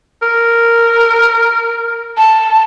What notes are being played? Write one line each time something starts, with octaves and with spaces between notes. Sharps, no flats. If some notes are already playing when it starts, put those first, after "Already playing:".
A#4
A5